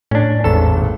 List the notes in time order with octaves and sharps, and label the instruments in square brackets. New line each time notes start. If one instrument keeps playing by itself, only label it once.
[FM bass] A2 [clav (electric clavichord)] C#4 D4
[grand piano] G#1 [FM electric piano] E2 D#3 A5 [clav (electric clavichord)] A4
[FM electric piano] A#2